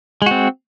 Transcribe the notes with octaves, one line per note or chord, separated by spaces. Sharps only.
G#3 C4 F#4